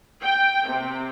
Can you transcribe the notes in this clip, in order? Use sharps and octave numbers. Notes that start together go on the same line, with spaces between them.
G5
C3